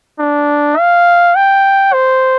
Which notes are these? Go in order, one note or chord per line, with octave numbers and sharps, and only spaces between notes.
D4
F5
G5
C5